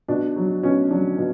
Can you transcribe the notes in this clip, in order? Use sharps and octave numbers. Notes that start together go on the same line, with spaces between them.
B2 D4
F#3
B2 C#4
F#3 D4
B2